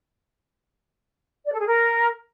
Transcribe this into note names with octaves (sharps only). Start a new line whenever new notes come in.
D5
A4
G#4
A#4